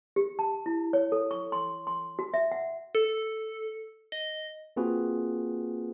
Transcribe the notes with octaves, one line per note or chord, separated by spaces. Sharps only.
G4
A5
E4
C#5
A4
C#6
C6
C6
F#4
E5
F#5
A4
D#5
A#3 C4 F4 F#4 G#4 B4